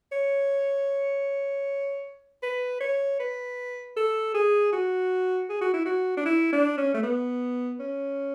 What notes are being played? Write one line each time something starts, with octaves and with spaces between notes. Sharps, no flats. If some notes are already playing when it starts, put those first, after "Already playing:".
C#5
B4
C#5
B4
A4
G#4
F#4
G#4
F#4
E4
F#4
D4
E4
D4
C#4
A3
B3
C#4